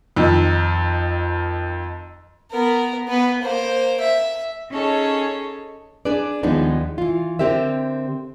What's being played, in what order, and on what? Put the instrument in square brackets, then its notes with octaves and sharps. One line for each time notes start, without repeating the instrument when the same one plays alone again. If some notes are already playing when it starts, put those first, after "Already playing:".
[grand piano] F2 D#3
[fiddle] B3 A#4
B3 B4
A#3 C5
E5
[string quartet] C#4 D#4 G#4 A4 C#5
[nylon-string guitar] D4 G#4 B4 D5
D#2 F3 G#3 B3 D4 D#4
E3 F4
D3 C4 G4 A#4 E5